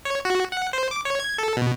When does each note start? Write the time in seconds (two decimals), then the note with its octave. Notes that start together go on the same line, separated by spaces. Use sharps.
0.05 C#5
0.25 F#4
0.52 F#5
0.73 C5
0.91 D6
1.05 C#5
1.20 G#6
1.38 A4
1.57 B2